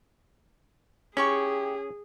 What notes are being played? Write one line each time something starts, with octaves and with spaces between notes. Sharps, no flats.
C#4 E4 G4 G#4 C#6